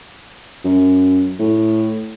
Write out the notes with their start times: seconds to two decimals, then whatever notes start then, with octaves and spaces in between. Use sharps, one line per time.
0.65 F#2
1.40 A2